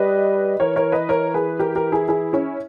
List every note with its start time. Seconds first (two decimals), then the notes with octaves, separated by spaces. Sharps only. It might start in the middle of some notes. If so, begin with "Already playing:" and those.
Already playing: G3 B4 D#5
0.60 E3 A#4 C#5
0.76 A#4 C#5
0.92 B4 D#5
1.09 A#4 C#5
1.34 G#4 B4
1.59 G4 A#4
1.76 G4 A#4
1.92 E4 G#4
2.08 E4 G#4
2.33 C#4 E4